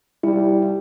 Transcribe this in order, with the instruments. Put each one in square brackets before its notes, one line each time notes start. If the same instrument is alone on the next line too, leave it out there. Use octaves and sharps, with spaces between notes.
[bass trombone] G3 [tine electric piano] E4